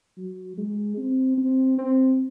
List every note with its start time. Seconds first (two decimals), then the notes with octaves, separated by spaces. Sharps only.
0.17 F#3
0.58 G#3
0.98 C4
1.38 C4
1.78 C4